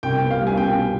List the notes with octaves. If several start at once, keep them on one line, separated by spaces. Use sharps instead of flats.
C2 G5
B3
F5
G3
G#5
B2 G5